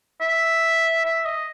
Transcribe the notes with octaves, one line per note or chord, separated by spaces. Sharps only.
E5
E5
D#5